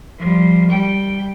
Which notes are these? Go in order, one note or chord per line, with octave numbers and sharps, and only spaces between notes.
F3 G3
G3 G5